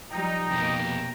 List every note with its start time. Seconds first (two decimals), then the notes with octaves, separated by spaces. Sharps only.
0.11 F3 G3 D#4 G5 A#5
0.51 F2 B2 A#3 G4